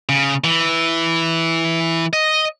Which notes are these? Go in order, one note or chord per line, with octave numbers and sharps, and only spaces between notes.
C#3
E3
D#5